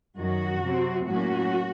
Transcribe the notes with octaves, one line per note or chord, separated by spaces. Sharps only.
F#2 D#3 F#3 F#4
C3 F#3 C4
A2 F#3 A#3 C#4 F#4